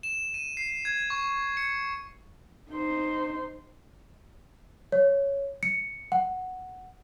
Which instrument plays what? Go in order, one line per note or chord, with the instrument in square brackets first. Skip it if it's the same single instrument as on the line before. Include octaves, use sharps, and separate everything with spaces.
[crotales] E7
D#7
C7
G#6
C#6
C#7
[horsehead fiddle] D#4 C5
[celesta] C#5
C#7
F#5